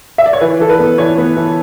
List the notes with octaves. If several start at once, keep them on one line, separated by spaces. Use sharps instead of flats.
E5
D5
C#5
E3 B4
E3 A4
B4
B3
E3 C#5
B3
E3